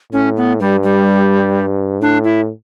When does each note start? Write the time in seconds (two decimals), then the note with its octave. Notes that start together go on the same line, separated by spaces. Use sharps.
0.12 A2 C#4
0.37 B3
0.60 G2 G3
0.83 G3
2.01 A2 D4
2.24 E4